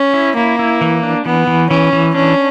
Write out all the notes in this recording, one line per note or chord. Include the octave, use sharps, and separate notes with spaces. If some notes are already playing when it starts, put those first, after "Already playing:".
Already playing: C#4
E4
A#3 E4
E4
E3
D4
E3 B3
E3
E3 C#4
E3
C#4 D4